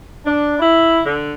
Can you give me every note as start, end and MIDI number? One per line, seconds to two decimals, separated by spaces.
0.24 0.56 62
0.59 0.99 64
1.05 1.33 50